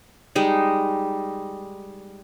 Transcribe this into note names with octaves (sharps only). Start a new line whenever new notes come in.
G3 G#3 D#4